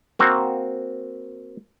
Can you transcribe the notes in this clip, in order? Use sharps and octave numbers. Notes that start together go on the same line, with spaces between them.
A#3 C4 F#4